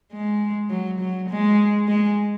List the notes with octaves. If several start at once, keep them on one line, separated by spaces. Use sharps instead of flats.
G#3
F#3
F#3
G#3
G#3